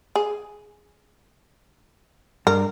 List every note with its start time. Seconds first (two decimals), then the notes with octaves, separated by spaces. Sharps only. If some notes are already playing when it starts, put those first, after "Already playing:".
0.16 G#4
2.47 G2 A#4